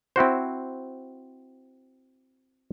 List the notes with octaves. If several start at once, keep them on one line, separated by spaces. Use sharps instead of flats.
C4 E4 F#4 C5